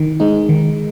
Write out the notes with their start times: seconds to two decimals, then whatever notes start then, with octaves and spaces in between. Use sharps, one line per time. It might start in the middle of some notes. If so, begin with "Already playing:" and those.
Already playing: D#3
0.20 G#3 D#4
0.49 D#3